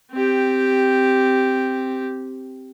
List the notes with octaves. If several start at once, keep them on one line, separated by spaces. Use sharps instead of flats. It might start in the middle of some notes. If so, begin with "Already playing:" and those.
C4 G4